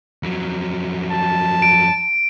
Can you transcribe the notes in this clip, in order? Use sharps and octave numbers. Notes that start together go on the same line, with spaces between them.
F2 F#3
A5
D7